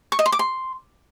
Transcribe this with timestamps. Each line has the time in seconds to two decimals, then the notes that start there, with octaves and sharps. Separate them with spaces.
0.12 C#6
0.19 D#5
0.26 C6
0.32 D6
0.39 C6